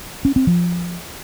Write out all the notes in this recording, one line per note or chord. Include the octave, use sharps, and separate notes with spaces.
C#4
C4
F3